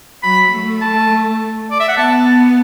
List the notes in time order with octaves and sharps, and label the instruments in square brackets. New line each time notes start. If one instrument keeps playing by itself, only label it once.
[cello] F#3 [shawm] B5
[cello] A3
[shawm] A5
D5
E5
F#5
[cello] B3 [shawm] A5